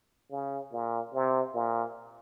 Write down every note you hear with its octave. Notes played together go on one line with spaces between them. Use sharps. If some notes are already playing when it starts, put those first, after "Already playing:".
C#3
A#2
C3
A#2